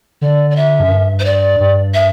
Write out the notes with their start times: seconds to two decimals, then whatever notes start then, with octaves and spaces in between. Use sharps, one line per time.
0.21 D3 D5
0.51 D5
0.56 E5
0.80 F#2
0.91 G2
1.20 C5
1.25 D5
1.60 G2
1.94 E5